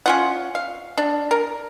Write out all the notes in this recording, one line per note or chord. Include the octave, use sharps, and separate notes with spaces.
C#4 F4 F#5
F5
D4
A#4